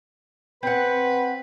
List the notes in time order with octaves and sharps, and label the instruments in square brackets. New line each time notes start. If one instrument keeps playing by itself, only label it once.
[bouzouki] C4 F#5 [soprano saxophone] B4